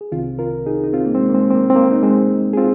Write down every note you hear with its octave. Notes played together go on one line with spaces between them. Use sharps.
G#4
C2 C3 D#3 C4 F4
F4 A#4
D#4 G#4
D#4
C4 F4
A#3
G#3 C4
A#3
G#3 C4
C4
A#3
C4
A#3
D#4
G#3 C4
G#4
C4 F4